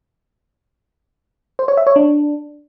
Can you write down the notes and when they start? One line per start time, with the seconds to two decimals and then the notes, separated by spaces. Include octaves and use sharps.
1.59 C5
1.68 C#5
1.77 E5
1.87 C#5
1.96 D4